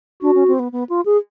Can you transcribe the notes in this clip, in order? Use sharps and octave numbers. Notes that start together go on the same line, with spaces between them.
D4 F#4
C#4
C4
B3
B3
F4
G#4